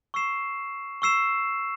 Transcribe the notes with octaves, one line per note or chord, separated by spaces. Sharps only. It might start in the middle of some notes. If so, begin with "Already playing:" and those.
C#6 E6 C7 E7
C#6 E6 C7 E7